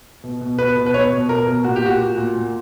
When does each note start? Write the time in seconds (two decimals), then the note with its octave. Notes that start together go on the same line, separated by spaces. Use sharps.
0.24 B2
0.41 B2
0.58 B2 B4
0.77 B2
0.86 B4
0.94 B2 C#5
1.12 B2
1.29 B2 A#4
1.47 B2
1.64 A#2 F#4
1.76 G4
1.83 A#2 F#4
2.00 A#2
2.18 A#2
2.35 A#2